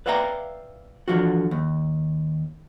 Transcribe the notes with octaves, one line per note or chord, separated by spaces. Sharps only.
B4 D5 E5 F5 G5 A#5
D3 E3 F3 F4 F#4
D#2